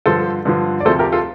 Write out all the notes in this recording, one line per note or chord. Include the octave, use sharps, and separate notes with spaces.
G2 D3 F3 A4 C5
G2 D3 F3
D5
D2 C3 F3 A4 C5
G4 A#4
F4 A4